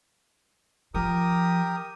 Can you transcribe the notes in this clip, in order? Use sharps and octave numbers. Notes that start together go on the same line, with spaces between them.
F3 G4 A#4 D#6